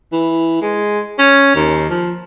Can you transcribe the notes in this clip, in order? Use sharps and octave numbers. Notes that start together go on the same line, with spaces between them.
E3
G#3
C#4
D#2
F3